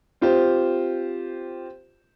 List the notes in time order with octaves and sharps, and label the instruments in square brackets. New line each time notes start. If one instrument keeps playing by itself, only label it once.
[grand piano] C4 F4 G4 C5